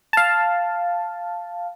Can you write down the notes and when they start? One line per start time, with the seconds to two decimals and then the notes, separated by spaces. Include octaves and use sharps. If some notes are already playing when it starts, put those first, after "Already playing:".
0.13 F5 A5